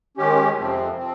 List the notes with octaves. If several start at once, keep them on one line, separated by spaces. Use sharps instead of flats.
D#3 G#3 C#4 G4
F2 C3 F3 C4
F3 C4